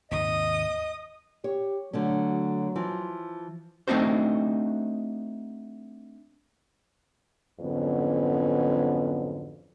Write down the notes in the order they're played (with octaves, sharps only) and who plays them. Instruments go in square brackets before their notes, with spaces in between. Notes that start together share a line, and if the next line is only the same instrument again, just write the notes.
[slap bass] D#2 G#2 C3 [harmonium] D#5 [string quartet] D#6
[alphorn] G4 [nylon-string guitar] C#5
[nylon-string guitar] D3 A3 C#4 [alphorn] F#3
[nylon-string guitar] E3 F3
[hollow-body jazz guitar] A3 C4 D4 D#4 F#4 C5
[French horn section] F2 G#2 D3 F#3 B3 C#4